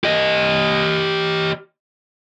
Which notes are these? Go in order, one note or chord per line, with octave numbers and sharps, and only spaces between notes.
G4 D#5